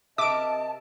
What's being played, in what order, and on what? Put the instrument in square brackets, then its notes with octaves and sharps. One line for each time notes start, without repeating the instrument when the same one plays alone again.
[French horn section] C3 D#5 [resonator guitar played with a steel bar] A#4 E5 [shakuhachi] A5 [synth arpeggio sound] D6 D7